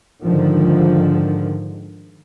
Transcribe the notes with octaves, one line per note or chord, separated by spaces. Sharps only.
G#2 D3 D#3 F3